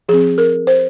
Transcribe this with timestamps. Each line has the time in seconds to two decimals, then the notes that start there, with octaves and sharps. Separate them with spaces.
0.09 F3 C4 G#4
0.38 A#4
0.67 C5